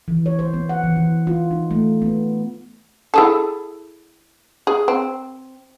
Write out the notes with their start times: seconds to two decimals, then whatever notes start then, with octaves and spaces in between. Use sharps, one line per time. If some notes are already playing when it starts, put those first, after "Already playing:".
0.08 E3
0.26 C#5
0.39 C5
0.54 B3
0.69 F#5
0.84 E3
0.96 E3
1.27 F4
1.51 D#4
1.71 A3
2.02 B3
3.14 E4 G#4 A4
4.67 G#4
4.88 C4